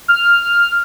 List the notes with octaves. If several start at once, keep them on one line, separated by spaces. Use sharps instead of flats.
F6